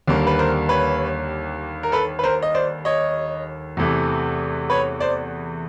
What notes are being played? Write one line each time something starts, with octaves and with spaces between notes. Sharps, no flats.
D#2 D3 G3 A#3
B4
A#4 C5
B4 C#5
A#4
A4 B4
B4
A#4 C5
D#5
C5 D5
C#5 D#5
E2 C3 E3 A3
B4 C#5
C5 D5